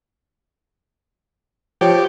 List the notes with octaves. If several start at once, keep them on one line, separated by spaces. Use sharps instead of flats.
F3 G4 C#5